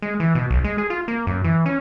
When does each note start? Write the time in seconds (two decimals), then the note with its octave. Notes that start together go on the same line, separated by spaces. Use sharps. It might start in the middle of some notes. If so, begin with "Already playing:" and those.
0.02 G#3
0.20 E3
0.35 B2
0.51 B1
0.64 G#3
0.78 G#4
0.90 F4
1.08 A#3
1.27 F#2
1.44 E3
1.66 C#4